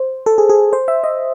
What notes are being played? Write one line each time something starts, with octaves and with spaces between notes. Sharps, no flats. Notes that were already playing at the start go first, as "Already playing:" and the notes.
Already playing: C5
A4
G#4
G#4
C5
E5
D#5